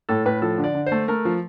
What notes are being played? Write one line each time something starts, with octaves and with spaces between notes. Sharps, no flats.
A2 A4
A2 B4
F3 A4
D3
D5
D3
C5
A3
A3 A#4
F3